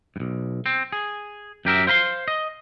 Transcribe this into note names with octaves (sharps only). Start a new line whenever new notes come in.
B1 G2
C4
G#4
F#2 G4 A#4 E5
C5 F5 B5 C6
D#5